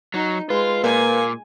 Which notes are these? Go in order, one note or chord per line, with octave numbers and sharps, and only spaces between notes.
F#3 D#4
G#3 F4 B4
A#2 A#3 G#5